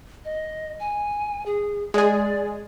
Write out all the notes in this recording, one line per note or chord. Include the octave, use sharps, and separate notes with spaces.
D#5
G#5
G#4
G#3 G#4 D5